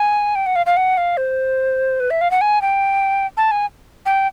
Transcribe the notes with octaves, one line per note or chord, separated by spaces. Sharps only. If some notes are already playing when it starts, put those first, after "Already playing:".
Already playing: G#5
G5
F#5
F5
F5
F#5
F5
C5
B4
E5
F5
F#5
G#5
G5
A5
G#5
G5